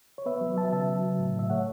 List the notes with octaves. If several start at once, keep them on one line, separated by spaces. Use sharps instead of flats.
C#5
B3 B4 E5
F#3
F#3 E5 A5
C#3 E5 A5
F#3
F#3
A2
A2 E5
A3 C#5 F#5